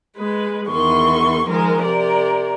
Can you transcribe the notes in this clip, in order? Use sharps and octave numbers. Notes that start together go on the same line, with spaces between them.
G#3 B4
E2 D#3 C6 C#6
D#3 F3 G#3 A#4
C3 A#4 D5